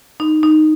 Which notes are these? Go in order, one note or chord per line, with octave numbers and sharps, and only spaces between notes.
D#4
D#4